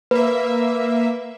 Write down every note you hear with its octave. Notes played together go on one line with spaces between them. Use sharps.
A#3 B4 E5